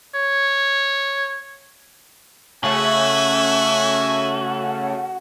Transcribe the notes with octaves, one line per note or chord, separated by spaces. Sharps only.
C#5
C#3 A3 C#4 F#4 E5 G#5